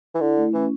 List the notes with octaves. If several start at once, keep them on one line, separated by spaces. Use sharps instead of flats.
E3
D3 E4
A3
E3 C#4